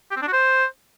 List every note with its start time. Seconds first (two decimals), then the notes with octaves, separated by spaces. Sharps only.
0.11 G4
0.17 C4
0.22 D4
0.27 F#4
0.33 C5